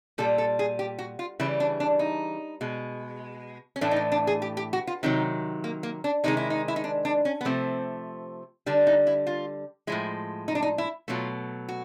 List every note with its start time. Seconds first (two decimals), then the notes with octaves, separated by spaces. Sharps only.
0.18 A#2 G3 A4
0.38 A4
0.59 G#4
0.79 G4
0.99 F#4
1.19 F4
1.40 C#3 E3 G3 E4
1.60 D4
1.80 D4
1.99 D#4
2.61 B2 G#3
3.76 C#4
3.81 A2 E3 A3 D4
3.91 D#4
3.96 D4
4.12 D4
4.27 G#4
4.42 G4
4.57 G4
4.73 F#4
4.87 F4
5.03 C3 D#3 F#3 D#4
5.64 A#3
5.83 A#3
6.04 D4
6.24 C3 D#3 G#3 D#4
6.37 E4
6.50 D#4
6.68 E4
6.76 D#4
6.84 D4
7.05 D4
7.25 C#4
7.41 B3
7.45 C3 F3 A3 C4
8.66 D3 G3 D4
8.87 D#4
9.07 E4
9.27 F4
9.87 A2 F3 G#3 E4
10.48 D#4
10.55 D4
10.63 D#4
10.78 E4
11.08 B2 F#3 A3 F4
11.69 F#4